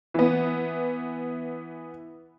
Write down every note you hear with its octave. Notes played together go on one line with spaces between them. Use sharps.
E3 B3